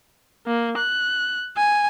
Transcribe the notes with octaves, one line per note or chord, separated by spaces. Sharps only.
A#3
F#6
G#5